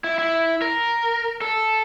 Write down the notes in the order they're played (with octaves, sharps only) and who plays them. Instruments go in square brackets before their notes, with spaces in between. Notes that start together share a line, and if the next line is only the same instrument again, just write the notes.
[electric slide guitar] E4
E4
A#4
A4